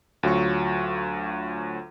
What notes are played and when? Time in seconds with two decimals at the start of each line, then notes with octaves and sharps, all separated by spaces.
0.23 D2 F#3 F4 C#6